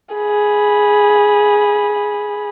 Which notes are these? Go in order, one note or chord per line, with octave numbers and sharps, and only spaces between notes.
G#4 B5